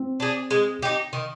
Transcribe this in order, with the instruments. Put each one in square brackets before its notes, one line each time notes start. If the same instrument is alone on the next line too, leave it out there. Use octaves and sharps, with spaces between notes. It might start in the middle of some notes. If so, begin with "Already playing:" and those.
Already playing: [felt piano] C4
[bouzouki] D4 G#4
G#3
D#4 G4
D#3